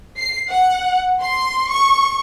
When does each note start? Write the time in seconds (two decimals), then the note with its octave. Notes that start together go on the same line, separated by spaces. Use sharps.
0.18 C7
0.50 F#5
1.21 C6
1.70 C#6